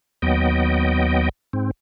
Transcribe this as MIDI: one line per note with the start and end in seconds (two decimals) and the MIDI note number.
0.22 1.29 39
0.22 1.29 54
0.22 1.29 59
0.22 1.29 75
0.22 1.29 79
1.53 1.71 44
1.53 1.71 60